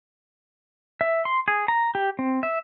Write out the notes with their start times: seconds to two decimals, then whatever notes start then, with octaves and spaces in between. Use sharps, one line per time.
1.01 E5
1.25 C6
1.48 G#4
1.68 A#5
1.95 G4
2.19 C4
2.43 E5